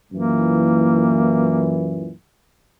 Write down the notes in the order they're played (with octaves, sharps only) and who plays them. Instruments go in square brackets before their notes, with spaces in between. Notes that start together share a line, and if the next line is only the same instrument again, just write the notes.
[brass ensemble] F#2 A#2 E3 [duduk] A#3